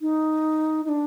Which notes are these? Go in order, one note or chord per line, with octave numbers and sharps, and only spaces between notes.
D#4
D#4
D4